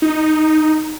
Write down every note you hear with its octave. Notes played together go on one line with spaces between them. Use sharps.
D#4